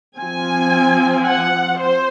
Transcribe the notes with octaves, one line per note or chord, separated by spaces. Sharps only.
F3 C4 G#5
F#5
C5